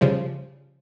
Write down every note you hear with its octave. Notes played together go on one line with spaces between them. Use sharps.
C#3 F3 G3